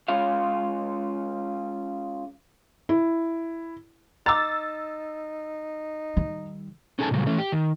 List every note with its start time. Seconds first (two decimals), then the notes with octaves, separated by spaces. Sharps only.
0.08 G#3 C#4 F4 C#5 F5
2.89 E4
4.26 D#4 A#5 D6 E6 A6
6.17 D#3 G3
6.99 C#4 D#4 G#4 A4 G#5 A5
7.11 A#2 C#3 F#3 G3
7.26 E3 A3 C#4
7.38 G4
7.52 D#3